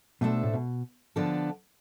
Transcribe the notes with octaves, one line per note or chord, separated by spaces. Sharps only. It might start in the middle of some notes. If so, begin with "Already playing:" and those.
B2 A3 D4 A4 C5 E5
A2
B2
D3 F3 B3 D4 A4